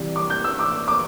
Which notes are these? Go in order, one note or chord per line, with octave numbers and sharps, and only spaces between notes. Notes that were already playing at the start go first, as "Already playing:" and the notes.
Already playing: C3 E3 G3
D6
G6
E6
D6
D6